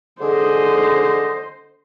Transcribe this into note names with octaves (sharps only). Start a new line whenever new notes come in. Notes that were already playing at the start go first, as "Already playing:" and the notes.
D3 G#4 C5 D#5